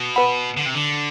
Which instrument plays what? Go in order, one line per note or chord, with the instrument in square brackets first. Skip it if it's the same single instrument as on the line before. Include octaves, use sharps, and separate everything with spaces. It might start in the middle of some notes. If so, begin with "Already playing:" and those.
Already playing: [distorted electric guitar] B2
[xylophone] B4 F#5 B5
[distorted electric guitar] D3
C3
D3